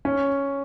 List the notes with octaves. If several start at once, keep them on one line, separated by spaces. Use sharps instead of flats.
C#4